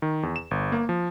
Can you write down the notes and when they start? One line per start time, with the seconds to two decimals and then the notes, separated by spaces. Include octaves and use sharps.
0.02 D#3
0.23 E2
0.36 E7
0.51 G1
0.72 A#3
0.89 F3